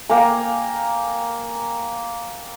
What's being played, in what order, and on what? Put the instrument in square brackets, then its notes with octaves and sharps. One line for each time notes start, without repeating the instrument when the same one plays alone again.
[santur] A#3 G5 G#5 A#5